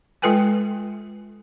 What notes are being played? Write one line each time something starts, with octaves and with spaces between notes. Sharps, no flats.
G#3 F4 A4 B4 G5 G#5